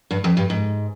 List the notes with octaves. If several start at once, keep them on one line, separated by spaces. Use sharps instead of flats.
G2
F2
G2
G#2